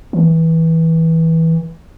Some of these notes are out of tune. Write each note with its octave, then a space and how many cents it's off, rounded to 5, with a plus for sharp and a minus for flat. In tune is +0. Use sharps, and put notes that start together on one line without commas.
E3 -20